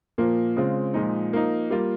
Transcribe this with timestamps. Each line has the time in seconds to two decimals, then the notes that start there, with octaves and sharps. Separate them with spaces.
0.18 A#2 F3 A#3
0.56 C#3 G#3 C4 F4
0.94 A#2 F3 G#3 D#4
1.32 F3 A#3 D#4
1.70 G3 A#3 F4